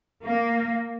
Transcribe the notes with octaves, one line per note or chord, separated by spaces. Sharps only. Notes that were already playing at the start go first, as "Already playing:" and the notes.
A#3